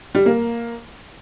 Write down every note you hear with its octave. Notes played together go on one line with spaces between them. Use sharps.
G3
A#3